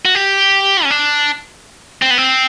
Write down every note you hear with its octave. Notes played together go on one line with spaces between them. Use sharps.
F#4
G4
C#4
D4
C4
B3
C4